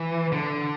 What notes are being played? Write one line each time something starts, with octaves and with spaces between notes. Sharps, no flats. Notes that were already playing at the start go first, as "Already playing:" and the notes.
Already playing: E3
D3